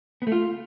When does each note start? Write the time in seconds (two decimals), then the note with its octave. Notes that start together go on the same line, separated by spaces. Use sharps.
0.22 B3
0.27 A3
0.32 F4